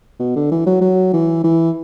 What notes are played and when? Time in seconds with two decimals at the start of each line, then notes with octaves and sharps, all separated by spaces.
0.20 B2
0.36 D3
0.52 E3
0.67 F#3
0.81 F#3
1.13 E3
1.44 E3